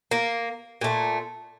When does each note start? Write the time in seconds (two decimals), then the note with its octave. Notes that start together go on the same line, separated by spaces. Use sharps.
0.11 A#3
0.81 A#2 A3